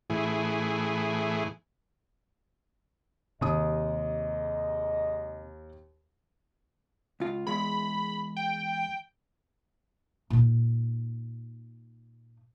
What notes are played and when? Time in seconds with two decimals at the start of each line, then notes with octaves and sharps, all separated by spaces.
0.10 A2 E3 G#4
3.41 D#2 G#2 C3 D#5 D#6
7.20 C#2 F4
7.47 E2 G#3 B5
8.36 G5
10.30 A#2 D#4